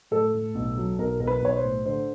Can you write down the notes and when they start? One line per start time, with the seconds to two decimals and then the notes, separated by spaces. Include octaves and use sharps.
0.11 A2 A4
0.34 A2
0.55 B1
0.77 F#3
0.99 B1 A#4
1.20 B1 A#4
1.27 B4
1.42 B1 C#5
1.57 C5
1.64 A2
1.85 D3 C5